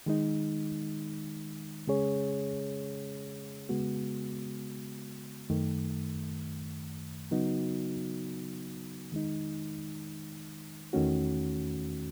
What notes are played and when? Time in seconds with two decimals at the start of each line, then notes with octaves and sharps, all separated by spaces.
0.06 D#3 G#3 D#4
1.87 C#3 G#3 C#4 G#4 C#5
3.69 C#3 G#3 B3 F#4
5.50 F#2 D#3 A3
7.31 C#3 F#3 B3 D#4 F#4
9.12 D#3 G#3 D#4
10.93 E2 D#3 A3 C#4 F#4